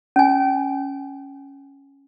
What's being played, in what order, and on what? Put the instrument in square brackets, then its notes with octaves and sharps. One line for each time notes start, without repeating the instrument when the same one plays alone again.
[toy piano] C#4 G#5